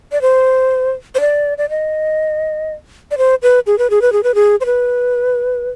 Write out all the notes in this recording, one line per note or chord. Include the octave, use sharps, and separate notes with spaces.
D5
C5
C5
D5
D5
D#5
D5
C5
B4
G#4
B4
G#4
B4
G#4
B4
G#4
C5
B4